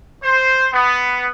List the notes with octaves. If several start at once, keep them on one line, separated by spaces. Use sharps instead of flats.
C5
B3